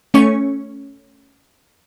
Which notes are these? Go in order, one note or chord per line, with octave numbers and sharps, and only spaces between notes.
A3 C#4 C#6